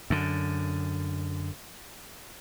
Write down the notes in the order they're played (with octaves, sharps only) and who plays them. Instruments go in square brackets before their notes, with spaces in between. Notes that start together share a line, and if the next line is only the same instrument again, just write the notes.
[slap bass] F#2 D3